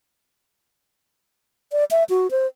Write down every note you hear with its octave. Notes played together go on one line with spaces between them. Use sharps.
D5
E5
F#4
C5